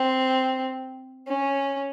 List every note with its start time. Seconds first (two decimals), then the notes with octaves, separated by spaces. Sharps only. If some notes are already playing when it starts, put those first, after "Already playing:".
Already playing: C4
1.27 C#4